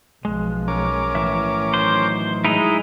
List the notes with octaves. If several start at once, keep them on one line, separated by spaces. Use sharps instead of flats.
B1 F3 G#3
C#4 A#4 D6
A2 E3 E5
D#3 F#3 C5
G#3 D#4 E4